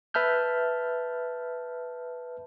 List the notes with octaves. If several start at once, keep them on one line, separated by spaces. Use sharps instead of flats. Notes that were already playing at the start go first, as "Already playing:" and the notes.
B4 E5 A5 F6 G6